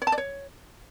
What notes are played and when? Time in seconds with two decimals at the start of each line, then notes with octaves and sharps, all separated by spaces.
0.02 C#5
0.07 A5
0.12 D5
0.18 C#5